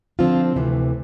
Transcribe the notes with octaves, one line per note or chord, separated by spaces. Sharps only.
D3 F3 C4 F4
D2 C3 E3